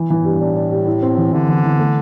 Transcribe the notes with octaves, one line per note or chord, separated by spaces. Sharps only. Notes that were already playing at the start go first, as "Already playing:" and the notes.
Already playing: E3
A2 E3
G2 G3
A2 D4
D4
G3
E4
C4
E3
D3 E4
E3
E3
A3